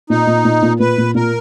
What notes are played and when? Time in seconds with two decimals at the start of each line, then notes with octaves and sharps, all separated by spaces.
0.10 A#2 D#4
0.27 A#2
0.45 A#2
0.62 A#2
0.80 A#2 B4
0.98 A#2
1.15 A#2 A#4